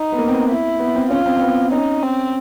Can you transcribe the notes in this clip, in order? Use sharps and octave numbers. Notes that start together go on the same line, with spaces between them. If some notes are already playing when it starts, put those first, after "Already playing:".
Already playing: D#4
B3
A#3
C4
B3
E4
B3
C4
C#4 F4
C4
C4
B3
C#4 D#4
C4